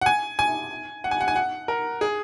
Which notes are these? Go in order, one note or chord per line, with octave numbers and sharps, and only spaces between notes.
F#5
G#5
G#5
F#5
G#5
F#5
G#5
F#5
A#4
G#4